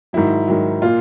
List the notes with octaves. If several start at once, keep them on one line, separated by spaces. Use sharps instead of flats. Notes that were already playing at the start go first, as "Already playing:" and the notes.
G#2 D#3 F#3 E4
G#2 D#3 F#3
A#2 F4